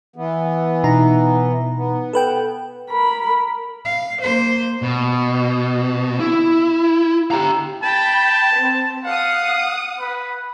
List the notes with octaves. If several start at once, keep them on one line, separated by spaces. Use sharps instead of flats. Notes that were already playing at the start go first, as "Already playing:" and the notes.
E3 B3
B2 D#4 A#5
B3
A4 B4 G5
A#4 B5
F5
A#3 C5
B2
E4
G4 A#5
G5 A5 B5
C4
F5 F#5 D#6
B4